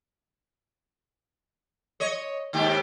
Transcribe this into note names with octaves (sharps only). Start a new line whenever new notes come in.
C#5 D#5
D#2 G#2 G4